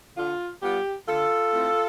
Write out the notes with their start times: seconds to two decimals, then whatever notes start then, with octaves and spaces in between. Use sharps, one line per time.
0.18 D3 F4
0.63 G3 B3 F4 G4
1.08 D3 F4 A4
1.53 A3 C4 E4